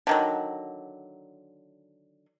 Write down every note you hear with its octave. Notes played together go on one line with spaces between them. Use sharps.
D3 D#3 F#3